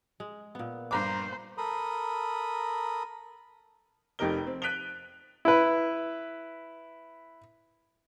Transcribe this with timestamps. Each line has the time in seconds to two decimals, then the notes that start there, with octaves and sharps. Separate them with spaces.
0.20 G#3
0.55 A#2 B3
0.91 G2 C5 A#5 D6
1.57 A4 A#4 B5 D#6
4.19 F1 F2 D#4 G4 A#4 G7
4.47 C4
4.62 F#6 B6 D7 D#7 F7 G7
5.45 E4 B4